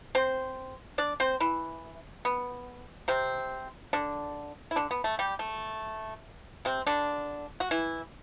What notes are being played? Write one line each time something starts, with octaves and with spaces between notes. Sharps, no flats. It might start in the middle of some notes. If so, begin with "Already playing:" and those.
C4 C5
D4 D5
C4 C5
E3 E4
B3
C3 C4
D3 D4
E4
D3 D4
B3
A3
G3 G4
A3
C3 C4
D3 D4
F#4
E3 E4